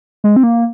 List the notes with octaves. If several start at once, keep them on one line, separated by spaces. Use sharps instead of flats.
G#3
C4
A#3